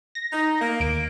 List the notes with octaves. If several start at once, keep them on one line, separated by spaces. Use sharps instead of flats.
A#6
D#4
A#3
D#2 D7